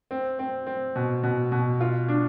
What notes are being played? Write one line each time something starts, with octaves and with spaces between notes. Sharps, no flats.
C4
C4
C4
B2
B2
B2
F4
D4